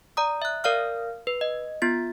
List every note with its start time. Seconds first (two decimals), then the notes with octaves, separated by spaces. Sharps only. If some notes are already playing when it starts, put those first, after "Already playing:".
0.17 D5 A#5 D#6
0.42 E5 F#6
0.64 A#4 D5 F5 F6
1.27 B4
1.41 D#5
1.82 B3 F4 A6